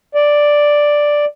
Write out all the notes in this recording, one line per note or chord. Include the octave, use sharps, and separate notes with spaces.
D5